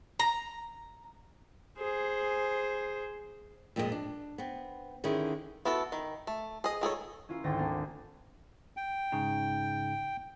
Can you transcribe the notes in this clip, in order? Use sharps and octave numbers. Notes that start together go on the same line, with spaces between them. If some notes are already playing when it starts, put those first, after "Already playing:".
A#5
G#4 C5
F2 A#2 G#3 E4 G#4 D#5
D4
B3 C4
D3 D#3 C#4 E4 G#4
B3 E4 F#4 A4
D#3
A3
G#4 D#5
D#3 G#4 A4 C#5
C#4 E4 F4 A#4
G#1 D2 A4 G5 A#6
A#3 C4 D4 A#4
G5
G#2 C#3 D#4